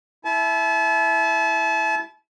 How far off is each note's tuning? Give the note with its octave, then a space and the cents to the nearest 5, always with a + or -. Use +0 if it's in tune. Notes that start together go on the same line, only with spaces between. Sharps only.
E4 +0 A5 -35